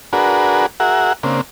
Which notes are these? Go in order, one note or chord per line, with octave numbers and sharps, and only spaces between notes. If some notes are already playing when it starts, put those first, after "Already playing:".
D4 F#4 G#4 A#4 B4
F#4 G#4 A#4 E5 F#5
C#3 A#3 C4 D4